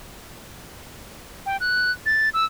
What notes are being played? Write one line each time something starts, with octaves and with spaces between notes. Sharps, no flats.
G5
F#6
A6
E6